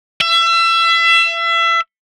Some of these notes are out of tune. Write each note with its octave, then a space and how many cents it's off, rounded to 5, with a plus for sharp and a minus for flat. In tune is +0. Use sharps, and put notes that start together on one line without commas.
E5 +30